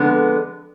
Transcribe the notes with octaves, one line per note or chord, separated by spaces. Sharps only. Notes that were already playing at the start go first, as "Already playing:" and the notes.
Already playing: F2 D3 G#3 B3